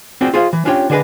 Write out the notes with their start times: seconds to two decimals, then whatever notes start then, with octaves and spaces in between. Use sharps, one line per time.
0.21 C4 F4 F#4 G#4 D5 G5
0.34 F4 G#4 C5 F5
0.53 E3
0.65 C#4 D4 F4 G4 C#5 G5
0.90 D3 D4 G#4 B4 D#5